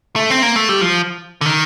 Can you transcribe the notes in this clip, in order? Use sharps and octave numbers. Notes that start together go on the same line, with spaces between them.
A3
C4
A#3
A3
G3
F3
D3
D#3